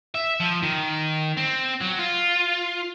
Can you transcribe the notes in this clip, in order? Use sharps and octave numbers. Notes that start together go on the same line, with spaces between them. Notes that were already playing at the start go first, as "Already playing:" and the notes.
E5
F3
D#3
C4
F#3
F4